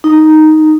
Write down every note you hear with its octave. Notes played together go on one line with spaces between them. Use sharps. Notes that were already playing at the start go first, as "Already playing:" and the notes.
D#4